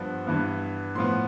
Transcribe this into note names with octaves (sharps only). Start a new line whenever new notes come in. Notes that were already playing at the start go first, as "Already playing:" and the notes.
Already playing: G2 F3 B3
G2 E3 B3
A2 F3 B3 C6